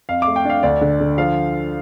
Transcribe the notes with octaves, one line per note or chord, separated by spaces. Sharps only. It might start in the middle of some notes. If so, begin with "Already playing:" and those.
F2 F5
D6
A3
G5
D4 F5
D2 D5
D3
D3
F3 F5